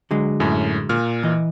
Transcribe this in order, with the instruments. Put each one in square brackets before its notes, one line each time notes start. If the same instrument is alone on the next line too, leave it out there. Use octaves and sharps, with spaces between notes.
[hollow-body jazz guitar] D3 F#3 G#3
[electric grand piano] F#2 A2
A#2 F6
[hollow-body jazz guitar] E3 D#5